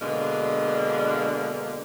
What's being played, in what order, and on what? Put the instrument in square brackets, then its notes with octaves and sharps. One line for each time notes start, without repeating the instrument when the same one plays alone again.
[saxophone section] B2 D3 G#3 A#3 D4